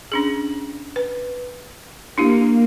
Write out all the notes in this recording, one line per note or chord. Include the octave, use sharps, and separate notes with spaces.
C#4 D4 G#4
B4
A#3 D4 E4 G4